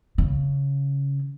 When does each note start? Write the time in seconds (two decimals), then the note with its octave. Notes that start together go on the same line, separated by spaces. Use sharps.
0.18 C#3